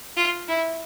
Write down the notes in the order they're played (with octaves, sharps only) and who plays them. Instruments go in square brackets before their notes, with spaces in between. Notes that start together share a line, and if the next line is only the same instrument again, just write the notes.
[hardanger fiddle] F4
E4